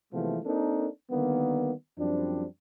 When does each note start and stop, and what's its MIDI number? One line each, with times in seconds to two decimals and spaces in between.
0.13 0.38 48
0.13 0.38 52
0.13 0.38 53
0.13 0.38 56
0.13 0.38 57
0.13 0.38 59
0.45 0.87 58
0.45 0.87 60
0.45 0.87 62
0.45 0.87 63
0.45 0.87 69
0.45 0.87 70
1.10 1.72 50
1.10 1.72 51
1.10 1.72 55
1.10 1.72 58
1.10 1.72 59
1.98 2.45 42
1.98 2.45 53
1.98 2.45 55
1.98 2.45 60
1.98 2.45 62